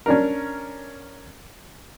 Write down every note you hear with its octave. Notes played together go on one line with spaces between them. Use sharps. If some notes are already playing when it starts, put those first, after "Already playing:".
C#4 D4 A#4